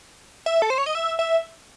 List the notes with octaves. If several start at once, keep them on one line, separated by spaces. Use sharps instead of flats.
E5
A4
C5
C#5
D#5
E5
E5